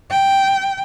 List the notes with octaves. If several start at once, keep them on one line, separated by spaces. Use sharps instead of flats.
G5